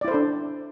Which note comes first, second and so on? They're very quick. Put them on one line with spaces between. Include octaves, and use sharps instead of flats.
D5 E4 C5 A4 D4